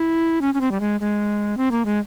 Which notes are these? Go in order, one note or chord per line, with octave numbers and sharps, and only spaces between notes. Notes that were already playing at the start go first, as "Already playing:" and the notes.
Already playing: E4
C#4
C#4
C4
G3
G#3
G#3
C4
A#3
G#3